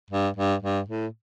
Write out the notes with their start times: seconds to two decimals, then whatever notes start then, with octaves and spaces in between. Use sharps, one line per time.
0.10 G2
0.36 G2
0.62 G2
0.88 A2